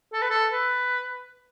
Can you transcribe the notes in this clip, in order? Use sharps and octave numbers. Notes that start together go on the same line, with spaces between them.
A4
B4
A4
B4